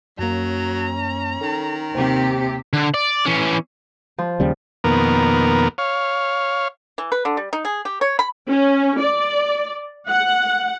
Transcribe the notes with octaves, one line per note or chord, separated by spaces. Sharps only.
F#2 F#3 A#3 C#4 A#5
D#3 A4
D#2 C3 G4 C5 G5
D3
D5
E3 C#4
F3
D#2 C#3 G3
F2 B2 D#3 A#3 B3 A#4
C#5 F5
E3
B4
D3
G3
D#4
G#4
G4
C#5
B5
C#4
D5
F#5